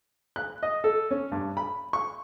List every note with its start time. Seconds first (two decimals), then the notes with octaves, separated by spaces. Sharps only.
0.36 F#6
0.63 D#5
0.84 A4
1.11 C#4
1.32 G2
1.57 B5
1.93 C#6